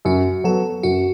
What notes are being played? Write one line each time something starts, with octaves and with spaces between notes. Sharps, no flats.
F#2 F#4
F#3 B3 A4
F#2 F#4